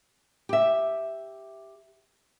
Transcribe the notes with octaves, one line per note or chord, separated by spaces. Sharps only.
G4 E5